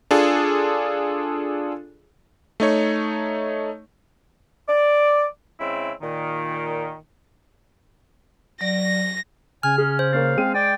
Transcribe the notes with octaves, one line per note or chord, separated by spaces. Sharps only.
D4 F4 G#4 A4
A3 D#4 C#5
D5
C#3 G#3 C4 E4 E5
A#2 D#3
F#3 D5 A#6
C#3 G#5 F6
C#4 G#4
C5
A#3 C#4 F5 A6
G#3 C4 D#7
D5 G5